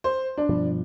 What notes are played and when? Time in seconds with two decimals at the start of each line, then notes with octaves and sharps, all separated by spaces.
0.04 C5
0.37 D4
0.49 G2 B2 F3